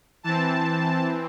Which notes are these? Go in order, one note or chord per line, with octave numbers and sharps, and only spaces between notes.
E3 C4 A5